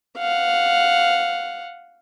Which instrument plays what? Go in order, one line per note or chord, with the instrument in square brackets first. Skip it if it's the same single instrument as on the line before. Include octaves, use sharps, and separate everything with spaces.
[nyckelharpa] F5 F#5